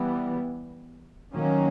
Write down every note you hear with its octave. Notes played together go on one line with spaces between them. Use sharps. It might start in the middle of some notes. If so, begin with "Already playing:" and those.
Already playing: E3 G3 B3
D#3 F#3 A#3 C#4